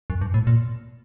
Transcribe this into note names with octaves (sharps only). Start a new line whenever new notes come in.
F#2
G2
A2
A#2